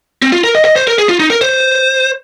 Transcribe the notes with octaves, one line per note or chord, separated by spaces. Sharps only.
C4
F4
A#4
D#5
D#5
C5
A#4
G#4
F4
D#4
A#4
C5